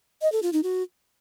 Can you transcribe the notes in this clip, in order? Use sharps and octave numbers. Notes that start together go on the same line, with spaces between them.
D#5
A4
F4
D#4
F#4